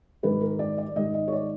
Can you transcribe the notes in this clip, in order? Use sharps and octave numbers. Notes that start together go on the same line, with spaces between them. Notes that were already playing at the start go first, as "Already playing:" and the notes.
G#2 D#3 G3 B4
A#4
D5
D5
G#2 D#3 G3 D#5
D#5
C#5
D5